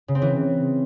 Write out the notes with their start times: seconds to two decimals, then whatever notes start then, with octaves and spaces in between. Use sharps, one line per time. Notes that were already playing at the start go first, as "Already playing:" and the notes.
0.08 C#3
0.15 C4
0.22 E3